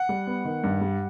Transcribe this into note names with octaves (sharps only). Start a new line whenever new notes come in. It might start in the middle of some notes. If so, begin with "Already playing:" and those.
Already playing: F#5
G3
B3
D#3
G2
G3